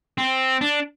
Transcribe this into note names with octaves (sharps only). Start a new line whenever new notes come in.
C4
D4